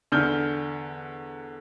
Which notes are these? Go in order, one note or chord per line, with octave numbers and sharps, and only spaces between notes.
E2 D3 D4 F6 G6 G7